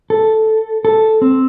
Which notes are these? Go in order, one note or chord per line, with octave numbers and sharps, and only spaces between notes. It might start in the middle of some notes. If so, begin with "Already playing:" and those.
A4
A4
C4